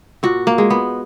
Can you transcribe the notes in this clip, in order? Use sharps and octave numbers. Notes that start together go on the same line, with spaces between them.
A#2 F#4
A#3
G#3
B3